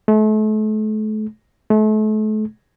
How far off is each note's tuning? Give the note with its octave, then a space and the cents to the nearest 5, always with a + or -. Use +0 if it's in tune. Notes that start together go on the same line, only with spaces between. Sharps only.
A3 -35
A3 -35